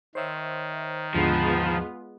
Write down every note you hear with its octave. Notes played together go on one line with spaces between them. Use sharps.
D#3 C5 C#5 E5
D#2 G#2 D3 F3 G#3 B3 F4